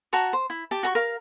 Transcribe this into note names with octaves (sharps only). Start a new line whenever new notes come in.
F#4 A5 A#5 C#6
C5
E4
G4 A5
F#4 A#5 C#6
A#4 F5